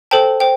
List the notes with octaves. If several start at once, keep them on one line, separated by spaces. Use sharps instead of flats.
A4 C5 G5 A5
C5 G5